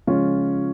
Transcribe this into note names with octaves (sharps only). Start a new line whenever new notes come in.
C#3 F3 G#3 C#4 F4